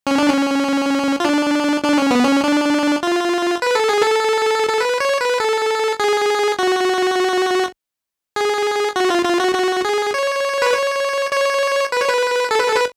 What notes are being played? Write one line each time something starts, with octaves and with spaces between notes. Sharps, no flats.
C#4
D4
C#4
F4
D4
D4
C#4
B3
C#4
D4
F4
B4
A4
G#4
A4
A4
B4
C#5
B4
A4
G#4
F#4
G#4
F#4
F4
F4
F#4
F#4
G#4
C#5
B4
C#5
C#5
B4
C#5
B4
A4
B4
A4
B4